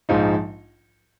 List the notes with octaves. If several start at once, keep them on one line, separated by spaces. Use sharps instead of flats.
A#1 G#2 F3 G#3 D#4